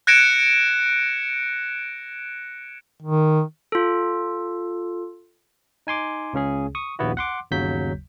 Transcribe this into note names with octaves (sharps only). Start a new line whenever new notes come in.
F#6 G#6 A#6 C#7 D7 E7
D#3
F4 A4
D#4 G#5 C6 D6
C#2 C#3 C#4 G#4
C#6 D#6
A#1 D#2 B3 E4 F#4
F#5 C6 D6
G1 D#2 C#3 F#3 G6 B6